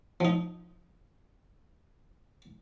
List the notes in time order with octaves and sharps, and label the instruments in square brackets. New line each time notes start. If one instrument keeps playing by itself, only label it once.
[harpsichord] F3 D#4